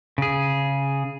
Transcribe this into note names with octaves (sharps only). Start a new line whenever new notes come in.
C#3 G#4